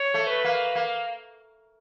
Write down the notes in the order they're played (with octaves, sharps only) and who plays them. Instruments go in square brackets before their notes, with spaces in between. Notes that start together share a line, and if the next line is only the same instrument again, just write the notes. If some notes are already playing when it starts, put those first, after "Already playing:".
Already playing: [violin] C#5
[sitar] A3
[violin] B4
[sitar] A#3
A#3